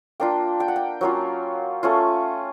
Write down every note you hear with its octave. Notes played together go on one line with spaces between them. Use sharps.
A#3 D4 F4 G5
G5
F#5
G5
F#3 A#3 C#4 F4
A3 C#4 F4